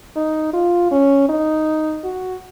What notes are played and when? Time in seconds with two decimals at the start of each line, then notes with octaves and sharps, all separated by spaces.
0.16 D#4
0.53 F4
0.91 C#4
1.29 D#4
2.04 F#4